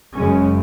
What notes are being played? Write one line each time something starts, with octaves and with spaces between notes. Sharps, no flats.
F#1 F#2 C#3 G#3 C#4